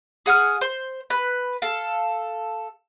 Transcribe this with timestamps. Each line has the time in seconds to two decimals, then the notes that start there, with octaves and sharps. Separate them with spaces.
0.26 G#4 F#5 G#5 F6
0.61 C5
1.10 B4
1.62 A4 F5